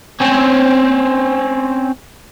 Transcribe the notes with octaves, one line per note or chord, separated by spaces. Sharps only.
C4 C#4